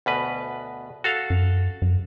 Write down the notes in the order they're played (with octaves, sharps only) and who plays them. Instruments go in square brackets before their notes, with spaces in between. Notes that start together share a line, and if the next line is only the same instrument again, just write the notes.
[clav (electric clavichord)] D2 B2 B4
F#4 A4 F5
[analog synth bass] F#2
F#2